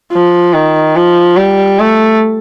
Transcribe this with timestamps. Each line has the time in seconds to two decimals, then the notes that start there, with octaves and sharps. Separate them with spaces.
0.12 F3
0.54 D#3
0.96 F3
1.37 G3
1.80 A3